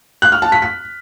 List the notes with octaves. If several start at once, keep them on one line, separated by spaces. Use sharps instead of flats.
F#6
F6
A5
B6
B6